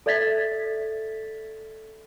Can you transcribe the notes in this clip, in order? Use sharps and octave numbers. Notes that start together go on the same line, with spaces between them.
A4 D5 E5 G#6 A6 B6